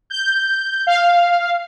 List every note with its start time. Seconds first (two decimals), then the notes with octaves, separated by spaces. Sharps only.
0.10 G6
0.87 F5